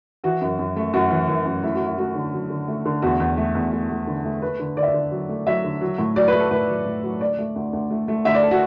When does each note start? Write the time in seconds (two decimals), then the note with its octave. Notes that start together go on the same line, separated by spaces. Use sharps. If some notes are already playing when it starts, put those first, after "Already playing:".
0.24 E3 F#4
0.41 F#2
0.59 F#2
0.76 A3
0.94 F#2 F#4
1.11 E3
1.28 E3
1.46 F#2
1.63 A3 E4
1.75 F#4
1.80 F#3
1.86 E4
1.98 A3 F#4
2.15 D3
2.33 F#3
2.50 D3
2.68 A3
2.85 D3
3.02 E2 F#4
3.20 E2
3.37 A3
3.55 E2
3.72 A3
3.90 A3
4.07 D3
4.25 A3
4.42 A3 B4
4.59 D3
4.77 D3 D5
4.83 E5
4.88 D5
4.94 D3
5.11 F#3
5.29 A3
5.47 F#3 E5
5.64 D3
5.81 F#3
5.98 A2
6.16 F#3 D5
6.28 B4
6.34 A3
6.39 A4
6.51 A2 B4
6.69 F#3
6.86 A2
7.03 F#3
7.21 D2 D5
7.39 A3
7.56 D2
7.73 D2
7.90 A3
8.08 A3
8.25 D2 E5
8.34 D5
8.43 A4
8.51 F#4